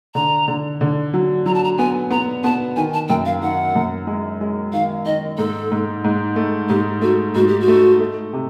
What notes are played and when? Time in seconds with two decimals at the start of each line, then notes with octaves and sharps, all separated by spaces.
0.15 D3 A#5
0.48 D3
0.81 D3
1.14 F#3
1.46 F#3 A#5
1.54 A5
1.64 A#5
1.78 B3 G#5
2.11 B3 A#5
2.44 B3 A5
2.76 D#3 G#5
2.94 A5
3.09 F#2 G5
3.25 F5
3.42 D#3 F#5
3.75 F#2
4.07 G#3
4.41 G#3
4.73 D#3 F5
5.06 D#3 D#5
5.38 G#2 A4
5.72 G#2
6.04 G#2
6.36 A3
6.69 G#2 G4
7.02 A3 F#4
7.35 G#2 F#4
7.48 G4
7.60 F#4
7.68 A3
8.00 A3
8.33 C3